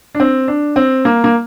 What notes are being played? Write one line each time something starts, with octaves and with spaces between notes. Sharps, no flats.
D4
C4
D4
C4
A#3
A#3